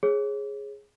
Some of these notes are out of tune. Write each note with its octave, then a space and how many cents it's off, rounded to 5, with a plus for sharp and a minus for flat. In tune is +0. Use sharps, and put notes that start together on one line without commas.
G#4 +0 C#5 -30